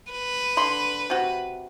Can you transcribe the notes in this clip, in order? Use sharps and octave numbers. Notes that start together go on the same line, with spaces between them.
B4
D3 B5 C6
C3 F#4